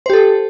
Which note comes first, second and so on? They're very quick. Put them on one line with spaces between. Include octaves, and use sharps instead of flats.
C5 G4 A4